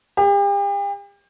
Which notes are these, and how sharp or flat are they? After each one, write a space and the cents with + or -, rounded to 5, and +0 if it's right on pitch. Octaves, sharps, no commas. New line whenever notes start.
G4 +40